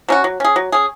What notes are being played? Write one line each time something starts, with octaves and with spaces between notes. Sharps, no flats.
F#3 C#4 F#4
F#3
C#4 G#4
F#3
C#4 G#4